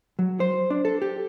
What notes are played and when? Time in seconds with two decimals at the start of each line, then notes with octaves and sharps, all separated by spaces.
0.19 F#3
0.40 C5
0.70 D4
0.85 A4
1.02 G4